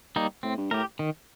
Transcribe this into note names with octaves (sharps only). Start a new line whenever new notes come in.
G3 A#3 D#4
A2 C4
G2
A2 G4 A#4
D#3